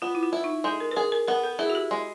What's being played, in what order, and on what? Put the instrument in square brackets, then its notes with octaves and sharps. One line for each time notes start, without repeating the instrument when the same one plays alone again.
[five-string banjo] B3 [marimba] F4
[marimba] E4
F4
[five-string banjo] E4
[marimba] D#4
[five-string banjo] G#3 [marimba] A4
[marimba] A#4
B4
[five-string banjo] G#4 [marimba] A#4
[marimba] A#4
[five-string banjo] B3 [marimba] A#4
[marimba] A4
[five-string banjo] E4 [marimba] G#4
[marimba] F#4
G4
[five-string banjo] G#3